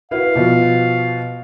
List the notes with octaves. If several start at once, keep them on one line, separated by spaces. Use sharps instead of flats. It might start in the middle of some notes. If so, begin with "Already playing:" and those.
E4 F#4 B4 F5
B2 F3